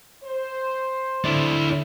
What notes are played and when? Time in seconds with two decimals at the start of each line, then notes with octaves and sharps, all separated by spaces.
0.24 C5
1.25 D3 E4 D5